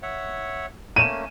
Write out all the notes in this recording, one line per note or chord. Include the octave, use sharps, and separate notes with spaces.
C#5 E5 F#5
A3 A#3 C#4 D#7 E7